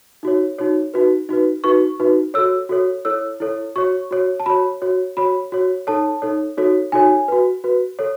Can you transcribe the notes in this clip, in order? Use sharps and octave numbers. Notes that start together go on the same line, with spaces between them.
D#4 F#4 C#5
D#4 F#4 C#5
D#4 F#4 B4
D#4 F#4 B4
D#4 F#4 B4 C#6
D#4 F#4 B4
F#4 A4 C#5 E6
F#4 A4 C#5
E4 A4 C#5 E6
E4 A4 C#5
F#4 C#5 C#6
F#4 C#5
A5
F#4 C#5 B5
F#4 C#5
F#4 C#5 B5
F#4 C#5
D#4 A4 C#5 A5
D#4 A4 C#5
D#4 F#4 A4 C#5
D#4 F#4 A4 C#5 G#5
F#4 B4
F#4 B4
A4 C#5